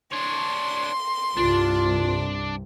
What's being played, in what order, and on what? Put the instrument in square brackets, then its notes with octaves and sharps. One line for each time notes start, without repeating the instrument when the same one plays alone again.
[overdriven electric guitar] D4 C#5 [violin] C6
[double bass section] C2 G2 C3 [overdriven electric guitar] D4 [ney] F4